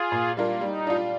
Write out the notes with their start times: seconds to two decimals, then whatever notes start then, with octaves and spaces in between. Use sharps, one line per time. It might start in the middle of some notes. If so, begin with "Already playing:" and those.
Already playing: F4 G#4
0.12 A#2
0.37 G3 D4 F4 A#4
0.61 G3 D#4
0.87 D4 F4